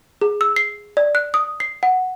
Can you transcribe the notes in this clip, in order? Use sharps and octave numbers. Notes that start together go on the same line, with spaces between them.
G#4
E6
C7
D5
F#6
D#6
C7
F#5